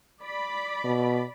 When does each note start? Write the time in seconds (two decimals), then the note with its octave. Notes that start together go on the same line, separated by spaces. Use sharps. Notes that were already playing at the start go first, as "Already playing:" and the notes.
0.22 D5 B5
0.84 B2